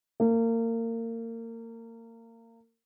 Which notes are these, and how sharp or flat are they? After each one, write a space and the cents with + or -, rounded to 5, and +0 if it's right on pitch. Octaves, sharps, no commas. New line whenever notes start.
A#3 -30